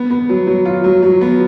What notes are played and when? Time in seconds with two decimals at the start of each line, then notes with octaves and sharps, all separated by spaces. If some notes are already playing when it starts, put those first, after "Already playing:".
Already playing: B3
0.10 B3
0.29 F#3
0.47 F#3
0.65 F4
0.84 F#3
1.02 F#3
1.21 B3